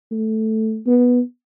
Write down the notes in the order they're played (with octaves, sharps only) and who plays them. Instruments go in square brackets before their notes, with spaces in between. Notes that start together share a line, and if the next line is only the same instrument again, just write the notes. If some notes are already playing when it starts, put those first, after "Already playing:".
[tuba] A3
B3